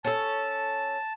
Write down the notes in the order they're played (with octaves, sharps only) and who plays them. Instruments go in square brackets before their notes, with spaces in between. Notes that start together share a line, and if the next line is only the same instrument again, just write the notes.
[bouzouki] C#4 A4 [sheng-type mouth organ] A5